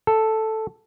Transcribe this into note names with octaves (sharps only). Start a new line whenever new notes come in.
A4